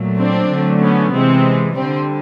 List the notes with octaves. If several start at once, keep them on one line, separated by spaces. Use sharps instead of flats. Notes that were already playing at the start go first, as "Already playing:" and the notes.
Already playing: A#2 F#3 A3
C4 D4
D3 F#3 A3
B3 C#4
C3 E3 G#3 C4
D3 G3 C4